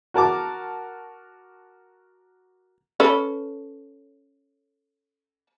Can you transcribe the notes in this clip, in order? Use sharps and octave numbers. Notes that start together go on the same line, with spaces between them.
F#4 A#4 A5 D6
C#4 A4 B4